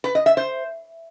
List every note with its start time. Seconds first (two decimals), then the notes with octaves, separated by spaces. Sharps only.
0.04 B4
0.15 D#5
0.26 E5
0.37 C5